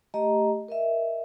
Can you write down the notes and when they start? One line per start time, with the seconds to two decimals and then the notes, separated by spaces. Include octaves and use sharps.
0.14 A3 G4 D#5 A#5
0.68 A#4 D#5 E5